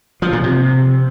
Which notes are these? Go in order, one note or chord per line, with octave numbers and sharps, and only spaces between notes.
F3
A#2
C3